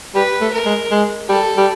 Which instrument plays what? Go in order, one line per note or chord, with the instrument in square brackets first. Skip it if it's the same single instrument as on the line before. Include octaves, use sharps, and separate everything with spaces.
[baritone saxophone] G3 [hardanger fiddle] B4
[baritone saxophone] A3
[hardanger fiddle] A#4
[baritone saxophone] G#3
G#3
[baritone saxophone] G3 [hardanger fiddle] A4
[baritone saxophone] G3